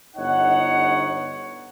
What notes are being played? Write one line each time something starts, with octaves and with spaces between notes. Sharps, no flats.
G1 D#4 C#5 F#5